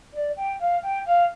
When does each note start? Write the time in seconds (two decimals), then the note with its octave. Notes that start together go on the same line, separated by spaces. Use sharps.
0.13 D5
0.37 G5
0.59 F5
0.83 G5
1.06 F5